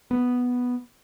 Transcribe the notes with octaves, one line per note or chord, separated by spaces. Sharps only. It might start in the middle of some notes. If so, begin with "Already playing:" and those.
B3